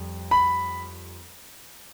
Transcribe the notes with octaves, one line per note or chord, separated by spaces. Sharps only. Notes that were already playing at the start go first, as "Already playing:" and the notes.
Already playing: F2 G3
B5